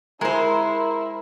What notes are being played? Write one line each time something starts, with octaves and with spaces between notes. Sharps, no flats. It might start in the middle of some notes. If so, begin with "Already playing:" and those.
G#3 E4 A#4 C5